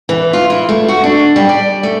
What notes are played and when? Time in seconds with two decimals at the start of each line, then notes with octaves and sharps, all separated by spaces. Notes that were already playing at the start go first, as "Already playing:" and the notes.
0.09 E3
0.33 F4
0.50 E4
0.69 A3
0.88 F#4
1.04 D4
1.36 G3
1.49 D5
1.83 A3